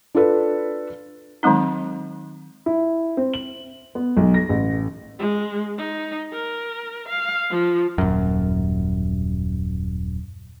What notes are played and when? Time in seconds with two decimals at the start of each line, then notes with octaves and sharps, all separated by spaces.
0.15 D4 F4 A4 B4
1.43 D#3 F#3 G#3 C4 D#4
2.66 E4
3.17 C4
3.34 F#7
3.95 B3
4.17 B1
4.34 A#6
4.49 A1
5.19 G#3
5.78 D#4
6.33 A#4
7.08 F5
7.50 F3
7.98 D#1 F#2